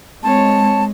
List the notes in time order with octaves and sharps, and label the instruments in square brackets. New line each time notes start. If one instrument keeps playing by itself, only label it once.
[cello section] G#3 [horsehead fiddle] C4 C#5 [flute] A5